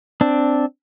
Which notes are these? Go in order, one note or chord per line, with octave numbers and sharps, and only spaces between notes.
C4 D4